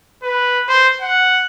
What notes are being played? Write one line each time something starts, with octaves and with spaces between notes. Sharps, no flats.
B4
C5
F#5